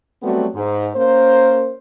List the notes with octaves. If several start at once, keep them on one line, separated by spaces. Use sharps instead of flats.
F#3 G3 A3 B3 C4 F#4
G#2
A#3 C#4 A#4 C5